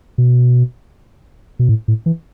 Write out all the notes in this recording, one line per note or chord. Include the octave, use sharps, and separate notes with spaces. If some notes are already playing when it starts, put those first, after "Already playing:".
B2
B2
A2
A2
E3